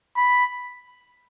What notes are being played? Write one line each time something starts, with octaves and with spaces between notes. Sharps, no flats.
B5